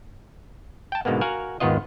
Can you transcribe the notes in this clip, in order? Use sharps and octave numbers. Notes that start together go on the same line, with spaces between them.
G5 A5
G#2 B2 D3 G#3 A#3 B3
F#4 A#4 F5 F#5 G#5
G#1 D#2 D#3 B3 F4 D#5